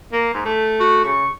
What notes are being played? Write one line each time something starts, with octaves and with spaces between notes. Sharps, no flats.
A#3
G#2
A3
F#4
C#3 C#6